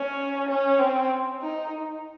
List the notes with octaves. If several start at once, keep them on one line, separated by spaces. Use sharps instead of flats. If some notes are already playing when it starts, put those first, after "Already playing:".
Already playing: C#4
C#4
C4
D#4